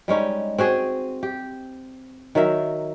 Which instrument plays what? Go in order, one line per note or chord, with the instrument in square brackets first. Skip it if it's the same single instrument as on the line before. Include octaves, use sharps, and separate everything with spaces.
[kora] G3 G#3 C#4 D#4
C4 F#4 G#4
G4
D#3 F#3 A#4 E5